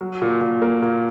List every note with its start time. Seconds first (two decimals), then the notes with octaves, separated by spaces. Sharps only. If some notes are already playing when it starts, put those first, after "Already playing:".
0.01 F#3
0.22 A#2
0.41 A#2
0.62 A#3
0.82 A#2